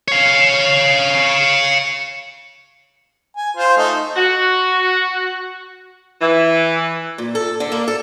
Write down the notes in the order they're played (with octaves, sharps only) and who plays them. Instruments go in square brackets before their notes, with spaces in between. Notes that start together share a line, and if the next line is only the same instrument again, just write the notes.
[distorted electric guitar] C#5 F5
[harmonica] G#5
F4 C5
A3 D#4
[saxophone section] F#4
E3
[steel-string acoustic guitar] A#2
A4
D3
A#3
A4